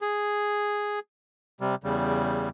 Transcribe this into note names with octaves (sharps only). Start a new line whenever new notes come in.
G#4
C3 G3
E2 C#3 G3